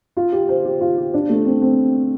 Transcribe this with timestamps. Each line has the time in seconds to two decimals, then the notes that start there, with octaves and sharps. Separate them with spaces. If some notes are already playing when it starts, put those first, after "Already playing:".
0.17 F4
0.32 G4
0.49 C5
0.65 G4
0.81 F4
0.97 G4
1.14 D4
1.29 A3
1.46 C4
1.62 C4